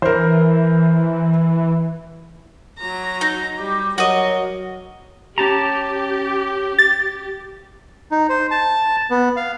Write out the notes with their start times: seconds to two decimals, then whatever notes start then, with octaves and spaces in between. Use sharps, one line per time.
0.02 E3 A#4 C5
2.79 F#3 A#5
3.21 D#4
3.59 G3 G4
3.98 F#3 F#4 A#4 D#5
5.38 C#4 G4 A5 A#5
6.79 A6
8.11 D#4
8.29 C5
8.51 A5
9.10 B3
9.37 F5